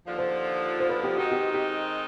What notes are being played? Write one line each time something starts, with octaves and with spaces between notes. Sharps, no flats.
D#2 D3 F3
C5
C5
B4
G4
D#3 G#3 C4 D#4 F#4
G4
G4